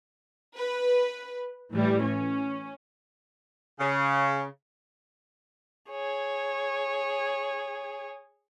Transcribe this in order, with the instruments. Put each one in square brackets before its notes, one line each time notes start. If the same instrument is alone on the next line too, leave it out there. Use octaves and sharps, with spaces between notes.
[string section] B4
A2 E3 G3
C#4
[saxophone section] C#3
[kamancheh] G#4 C#5